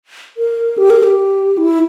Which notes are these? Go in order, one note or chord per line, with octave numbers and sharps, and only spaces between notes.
A#4
G4
A#4
G4
E4